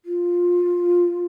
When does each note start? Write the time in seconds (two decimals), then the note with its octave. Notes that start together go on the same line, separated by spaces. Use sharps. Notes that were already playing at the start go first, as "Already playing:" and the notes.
0.05 F4